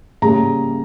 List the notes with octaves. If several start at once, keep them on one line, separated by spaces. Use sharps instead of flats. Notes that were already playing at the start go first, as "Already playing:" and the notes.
C#3 G3 A#3 A#5